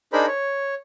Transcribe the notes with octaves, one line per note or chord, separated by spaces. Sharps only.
D4 D#4 G#4 A#4 C5 B5
C#5